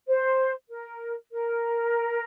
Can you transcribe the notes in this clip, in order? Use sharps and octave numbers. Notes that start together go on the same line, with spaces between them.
C5
A#4
A#4